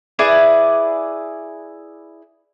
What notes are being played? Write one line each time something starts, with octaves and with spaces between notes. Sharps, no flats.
E4 G#4 B4 D5